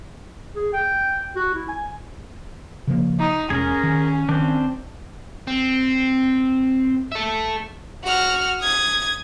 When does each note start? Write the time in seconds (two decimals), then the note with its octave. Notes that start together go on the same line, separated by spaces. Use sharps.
0.55 G#4
0.73 G5
1.36 F#4
1.54 E4
1.69 G#5
2.87 C#3 F3 A#3
3.19 D#4
3.50 E1 C#4 G#4 A#4
3.83 D#3
4.29 D#3 C4 D4
5.47 C4
7.12 A4 E5
8.04 F#4 F6
8.61 D#6 G#6